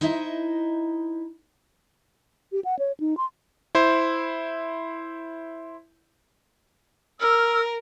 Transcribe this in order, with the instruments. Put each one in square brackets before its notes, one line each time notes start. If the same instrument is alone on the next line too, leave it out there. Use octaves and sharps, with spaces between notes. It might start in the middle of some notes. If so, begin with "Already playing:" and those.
[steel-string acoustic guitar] D#4 E4 C5 D#5 E5
[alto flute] G4
F#5
C#5
D#4
C6
[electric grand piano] E4 C5
[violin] A#4 [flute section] E6 F6